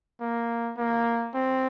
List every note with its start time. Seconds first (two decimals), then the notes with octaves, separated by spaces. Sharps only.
0.21 A#3
0.77 A#3
1.35 C4